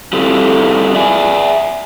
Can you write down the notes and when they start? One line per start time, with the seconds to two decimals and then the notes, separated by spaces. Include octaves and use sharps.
0.13 G3 C4 E4 F4 G4 A4
0.95 D5 E5 G#5